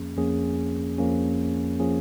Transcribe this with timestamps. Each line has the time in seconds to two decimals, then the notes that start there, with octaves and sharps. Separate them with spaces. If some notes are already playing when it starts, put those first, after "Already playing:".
Already playing: F2 F3 A#3 C#4 G#4
0.16 F2 F3 A#3 C#4 G#4
0.98 F2 F3 A#3 C#4 G#4
1.80 F3 A#3 C#4 G#4